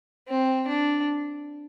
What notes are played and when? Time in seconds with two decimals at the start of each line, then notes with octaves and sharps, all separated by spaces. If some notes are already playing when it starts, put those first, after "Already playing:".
0.28 C4
0.68 D4